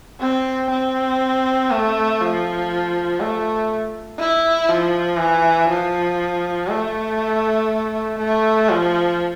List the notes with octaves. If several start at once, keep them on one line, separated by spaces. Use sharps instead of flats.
C4
C4
A3
F3
A3
E4
F3
E3
F3
A3
A3
F3